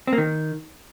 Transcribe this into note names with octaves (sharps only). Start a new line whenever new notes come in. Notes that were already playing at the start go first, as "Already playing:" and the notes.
C4
A#3
D#3